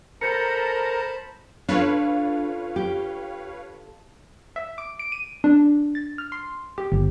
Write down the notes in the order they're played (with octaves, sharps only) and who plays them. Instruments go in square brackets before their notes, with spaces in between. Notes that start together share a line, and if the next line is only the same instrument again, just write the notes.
[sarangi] A4 [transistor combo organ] A#4 [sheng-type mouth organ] C5 A5 B5 [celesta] G6 C#7
[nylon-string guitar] D4 [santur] F4 A4 C#6 [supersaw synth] B4 C#5 F5
[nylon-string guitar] G4
[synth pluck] E5
D6
D7
D#7
D4
A6
F6
C6
G4
G1